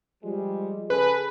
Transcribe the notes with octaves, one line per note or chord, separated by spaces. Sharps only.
F3 G3 G#3
C#3 G#4 A4 B4